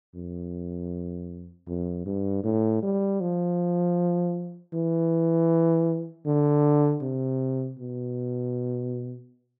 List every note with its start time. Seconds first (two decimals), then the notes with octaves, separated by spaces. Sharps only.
0.15 F2
1.68 F2
2.06 G2
2.44 A2
2.83 G3
3.21 F3
4.73 E3
6.26 D3
7.02 C3
7.79 B2